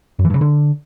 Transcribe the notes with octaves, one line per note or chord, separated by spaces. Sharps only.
F#2
E3
G2
C#3
D3